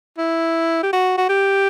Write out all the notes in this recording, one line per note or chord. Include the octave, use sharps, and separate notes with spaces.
E4
G4
F#4
F#4
G4